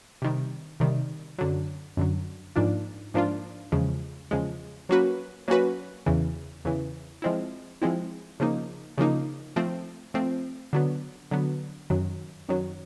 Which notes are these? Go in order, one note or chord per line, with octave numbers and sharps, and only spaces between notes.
C3 D#3 G3
C3 D#3 G3
F#2 D3 F#3
F#2 D3 F#3
G#2 F3 A#3 D4 F4
G#2 F3 A#3 D4 F4
E2 C#3 F3 G#3
E2 C#3 F3 G#3
F#3 A#3 C#4 F#4 B4
F#3 A#3 C#4 F#4 B4
E2 C#3 E3
E2 C#3 E3
F3 G#3 C4 E4
F3 G#3 C4 E4
C#3 F3 A#3 D#4
C#3 F3 A#3 D#4
F3 A3 C4
F3 A3 C4
D3 F#3 B3
D3 F#3 B3
F#2 D#3 F#3
F#2 D#3 F#3